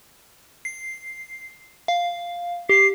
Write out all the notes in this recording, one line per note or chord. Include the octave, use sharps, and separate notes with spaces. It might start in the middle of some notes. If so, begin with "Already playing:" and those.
C7
F5
G4 C7